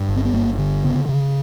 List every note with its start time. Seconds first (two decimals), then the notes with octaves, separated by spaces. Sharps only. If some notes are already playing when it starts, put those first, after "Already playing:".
Already playing: G2
0.09 G1
0.16 C4
0.25 B3
0.34 G1 A#3
0.58 D3
0.84 C#3 B3
1.09 C#3